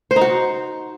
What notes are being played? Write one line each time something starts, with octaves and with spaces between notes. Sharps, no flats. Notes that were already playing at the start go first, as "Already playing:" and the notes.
C5
D#4
F#4